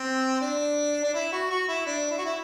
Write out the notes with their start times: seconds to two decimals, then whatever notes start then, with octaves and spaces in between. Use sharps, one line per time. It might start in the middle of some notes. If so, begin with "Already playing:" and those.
Already playing: C4
0.41 D4
1.03 D4
1.14 E4
1.32 F#4
1.50 F#4
1.68 E4
1.87 D4
2.11 E4
2.18 F#4
2.25 E4